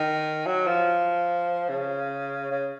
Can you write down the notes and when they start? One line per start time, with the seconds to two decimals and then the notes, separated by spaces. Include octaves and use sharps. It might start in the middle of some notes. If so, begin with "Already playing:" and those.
Already playing: D#3
0.47 F#3
0.67 F3
1.69 C#3
2.51 C#3